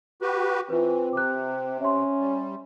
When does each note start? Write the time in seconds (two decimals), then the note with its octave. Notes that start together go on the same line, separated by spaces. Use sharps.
0.22 F#4 G4 B4
0.70 E3 C4 F4 B4
1.13 C3 D6 F#6
1.81 C#4 E5 C6
2.20 G3